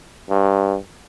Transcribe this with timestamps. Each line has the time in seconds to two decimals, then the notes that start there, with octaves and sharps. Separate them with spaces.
0.30 G2